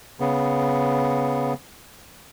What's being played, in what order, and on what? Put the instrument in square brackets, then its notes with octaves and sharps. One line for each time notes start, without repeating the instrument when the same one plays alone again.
[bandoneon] C#3 B3